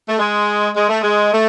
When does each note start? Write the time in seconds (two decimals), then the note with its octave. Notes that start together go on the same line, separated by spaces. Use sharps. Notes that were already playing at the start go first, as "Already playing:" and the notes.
0.09 A3
0.18 G#3
0.75 G#3
0.89 A3
1.01 G#3
1.33 A3